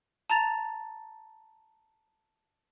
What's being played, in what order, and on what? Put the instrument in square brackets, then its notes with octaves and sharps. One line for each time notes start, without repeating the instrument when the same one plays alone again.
[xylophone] A5 A#5 A6 F7